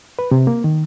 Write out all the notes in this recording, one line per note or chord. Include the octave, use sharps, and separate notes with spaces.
B4
C3
A#3
D#3